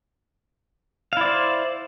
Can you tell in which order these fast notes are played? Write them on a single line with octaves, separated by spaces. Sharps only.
F5 E4 D5 C5